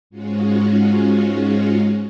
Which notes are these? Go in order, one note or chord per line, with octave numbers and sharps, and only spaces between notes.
G#2 G#3 C#4 F4 F#4